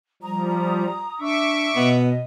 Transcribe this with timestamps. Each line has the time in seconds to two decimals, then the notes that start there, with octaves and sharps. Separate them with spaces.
0.22 F3 G3 A#5 D#6
1.21 D4 E5 C#6 D6 E6
1.76 B2 B3 D#5